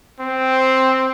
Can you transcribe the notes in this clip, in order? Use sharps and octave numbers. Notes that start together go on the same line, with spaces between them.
C4